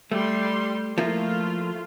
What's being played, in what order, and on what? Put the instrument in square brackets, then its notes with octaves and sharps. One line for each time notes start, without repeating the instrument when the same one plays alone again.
[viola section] G3 C6 [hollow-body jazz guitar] A3
[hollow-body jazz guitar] F3 A#3 E4 [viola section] A3 F4